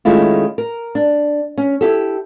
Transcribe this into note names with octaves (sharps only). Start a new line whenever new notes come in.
D#3 G#3 A3 C#4 E4 F4
A#4
D4
C#4
E4 G4 A4